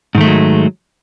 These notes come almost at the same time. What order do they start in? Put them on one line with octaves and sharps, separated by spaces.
G#2 D#3 A3 G#3 F#3